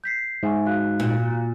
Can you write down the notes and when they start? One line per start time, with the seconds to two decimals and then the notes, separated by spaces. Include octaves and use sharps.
0.04 G6 B6 C7
0.43 G#2 E5 G#5 C#6
0.66 F#4 F5 F#6
1.00 A#2